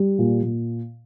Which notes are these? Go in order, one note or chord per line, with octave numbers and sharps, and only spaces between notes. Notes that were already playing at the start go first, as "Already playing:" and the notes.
Already playing: G3
A#2
A#2